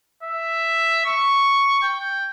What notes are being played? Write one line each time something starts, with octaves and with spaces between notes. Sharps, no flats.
E5
C#6
G5